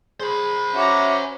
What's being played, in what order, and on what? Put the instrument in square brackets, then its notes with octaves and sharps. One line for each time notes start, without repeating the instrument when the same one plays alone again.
[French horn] G#4 [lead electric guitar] C5 B5
[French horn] C#4 [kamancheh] F#4 A#5 [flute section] E5 D6